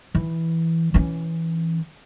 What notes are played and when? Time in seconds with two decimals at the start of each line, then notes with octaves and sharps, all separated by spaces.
0.15 E3
0.94 E3 C#4